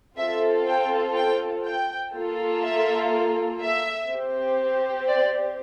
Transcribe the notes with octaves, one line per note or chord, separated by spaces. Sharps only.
C4 F4 A4 E5
G5
G5
G5
A#3 F4 A4
E5
E5
C4 G4
D5